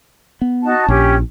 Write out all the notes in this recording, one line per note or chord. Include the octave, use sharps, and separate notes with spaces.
B3
D#4 F#4 A5
A#1 C#4 G4